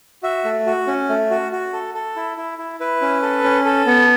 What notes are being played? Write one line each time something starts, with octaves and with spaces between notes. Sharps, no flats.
F#4 E5
A3
F#4
C#4
A3
F#4
F#4
A4
A4
E4
E4
E4
E4 B4
C#4
A4
C#4
A4
B3